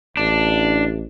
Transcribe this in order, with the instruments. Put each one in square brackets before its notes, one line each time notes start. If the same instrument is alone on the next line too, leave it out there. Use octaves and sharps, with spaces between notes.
[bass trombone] A1 [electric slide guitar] D4